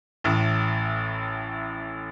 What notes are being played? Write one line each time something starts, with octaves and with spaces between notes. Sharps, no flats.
A1 A2